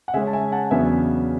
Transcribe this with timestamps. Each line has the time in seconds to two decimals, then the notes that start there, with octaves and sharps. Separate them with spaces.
0.08 F#5
0.14 C#3 G#3 C#4 E5 G#5
0.27 A5
0.33 E5 G#5
0.52 F#5 A5
0.71 E2 C#3 F#3 B3 D4 E5 G#5